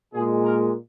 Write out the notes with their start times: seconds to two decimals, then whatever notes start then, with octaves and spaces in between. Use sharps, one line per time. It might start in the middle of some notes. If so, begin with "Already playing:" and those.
0.13 A#2 G#3 G#4
0.44 A#4